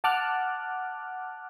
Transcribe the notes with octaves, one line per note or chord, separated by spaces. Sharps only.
F#5 A5 D6 F6 F#6